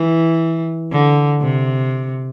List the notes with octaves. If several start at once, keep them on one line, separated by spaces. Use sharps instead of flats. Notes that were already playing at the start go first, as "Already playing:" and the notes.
Already playing: E3
D3
C3